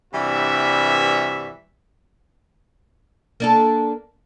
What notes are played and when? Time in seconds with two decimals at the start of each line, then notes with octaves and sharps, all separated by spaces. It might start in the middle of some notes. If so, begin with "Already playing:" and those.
0.14 G2 C3 E3 G3 F#4 E5
3.40 A#3 D4 A4